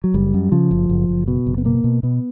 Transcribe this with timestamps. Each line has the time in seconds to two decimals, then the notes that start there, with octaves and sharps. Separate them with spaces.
0.04 F#3
0.14 F#1 G3
0.34 F#2
0.52 C#3 F3
0.71 F#1
0.89 F#1
1.09 F#1
1.28 B2
1.47 F#1
1.58 B3
1.65 B2 A#3
1.84 B2
2.03 B2 B3